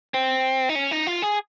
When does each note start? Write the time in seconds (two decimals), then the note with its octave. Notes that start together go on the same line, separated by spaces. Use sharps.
0.14 C4
0.69 D#4
0.75 C#4
0.91 D#4
1.07 F4
1.22 G#4